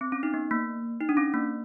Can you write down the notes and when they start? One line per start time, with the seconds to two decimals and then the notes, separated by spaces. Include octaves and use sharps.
0.01 C4
0.12 C#4
0.23 D#4
0.34 B3
0.51 A#3
1.01 D#4
1.09 D4
1.17 C#4
1.34 A#3